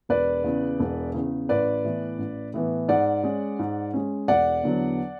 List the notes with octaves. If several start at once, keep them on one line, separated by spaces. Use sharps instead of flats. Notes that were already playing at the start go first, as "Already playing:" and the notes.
E1 B4 D5
E2 C#3
E1
E2 C#3
A1 B4 D5
A2 E3 B3
A1
A2 E3 B3
G#2 D5 F#5
G#3 C#4
G#2
G#3 C#4
E1 D5 F#5
E2 D3 F#3 B3